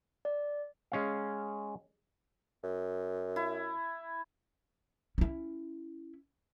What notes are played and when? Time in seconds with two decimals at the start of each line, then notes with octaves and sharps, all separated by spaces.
0.25 D5
0.92 G#3 C#4 F5
2.63 F#2
3.36 E4
5.18 C#4 E4